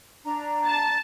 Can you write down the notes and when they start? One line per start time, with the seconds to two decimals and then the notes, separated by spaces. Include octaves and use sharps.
0.25 D4 A#5
0.66 A5